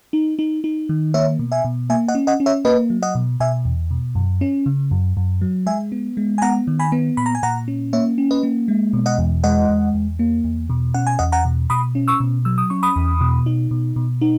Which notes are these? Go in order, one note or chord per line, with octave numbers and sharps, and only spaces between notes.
D#4
D#4
D#4
D#3
A#3 C#5 E5
B2
E5 G#5
B2
A#3 E5 G#5
D#5 F#5
C#4
D#5 F#5
C#4
C#5 E5
A#3 B4 D#5
F#3
D#5 F#5
B2
B2 E5 G#5
E2
B2
F#2
C#4
C#3
F#2
F#2
F#3
G#3 E5 G#5
B3
G#3
G#5
B3 F#5 A#5
D#3
G#5 B5
B3
A#2 B5
A#5
G#5
A#2 F#5 A#5
C#4
A#3 C#5 E5
C#4
B4 D#5
A#3
G#3
B2
D#5 F#5
E2
G#3 D#5 F#5
E2
E2
A#3
E2
B2
C#4 F#5
G#5
E2 D#5 F#5
F#5 A#5
B2
B2 B5 D#6
C#4
C#6 E6
B2
F#3 E6
D#6
C#4 C#6
B5 D#6
E2
B2
D#4
B2
B2
D#4